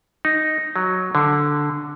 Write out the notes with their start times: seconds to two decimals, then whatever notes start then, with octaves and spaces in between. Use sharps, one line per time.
0.25 D#4
0.76 F#3
1.15 D3